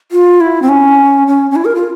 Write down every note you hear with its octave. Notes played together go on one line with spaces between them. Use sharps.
F4
E4
C4
C#4
C#4
C#4
E4
A#4
F4